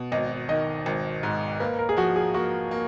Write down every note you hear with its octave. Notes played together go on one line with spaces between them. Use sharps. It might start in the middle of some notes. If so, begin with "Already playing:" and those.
Already playing: B2
G#1 D#5
D#3 D#5
G#1
G#2
A#3 B4
A#4
G#4
F3 F#4
G#4
A#3 F#4
A#3